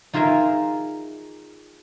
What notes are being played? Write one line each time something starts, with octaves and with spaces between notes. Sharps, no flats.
D#4 F4 G#4 A#4 E5 G#5